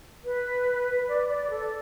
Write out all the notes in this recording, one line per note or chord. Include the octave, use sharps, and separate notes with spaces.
B4
D5
D5
A4